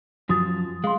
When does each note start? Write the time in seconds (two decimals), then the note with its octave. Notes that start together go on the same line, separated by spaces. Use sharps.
0.29 F#2 F3 F#4 D#6 A6
0.84 G#3 F5 C6